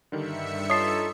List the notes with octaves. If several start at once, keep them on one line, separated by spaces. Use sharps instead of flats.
G2 D3 D#3 G3 E5 C#7
D#4 F4 A4 C#5 D#6 C7